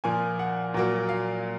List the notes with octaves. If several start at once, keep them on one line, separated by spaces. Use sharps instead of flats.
A#2 F3 A#3 G#5
F#5
A#2 F#3 A#3
F5